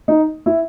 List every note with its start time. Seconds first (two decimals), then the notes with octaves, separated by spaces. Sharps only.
0.08 D#4
0.46 E4